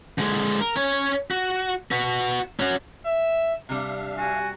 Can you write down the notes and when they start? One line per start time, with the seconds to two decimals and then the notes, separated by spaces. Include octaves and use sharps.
0.18 D3 G#3
0.61 A#4
0.76 C#4 C#5
1.31 F#4
1.91 F#4 B4
2.60 C#4 F#4
3.05 E5
3.69 C3 G3 D4 E5 F5
4.17 F#4 G#5